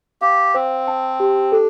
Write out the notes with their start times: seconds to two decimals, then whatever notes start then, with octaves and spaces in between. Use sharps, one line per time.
0.21 G4 F5
0.54 C4 C5
0.88 A5
1.20 G4
1.52 D4 A4